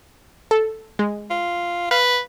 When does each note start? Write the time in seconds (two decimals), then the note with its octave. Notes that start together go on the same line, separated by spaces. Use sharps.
0.51 A4
0.99 G#3
1.30 F4
1.91 B4 F5